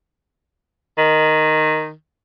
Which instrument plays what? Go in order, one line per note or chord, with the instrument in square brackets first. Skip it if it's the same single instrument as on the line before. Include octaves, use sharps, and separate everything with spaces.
[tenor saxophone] D#3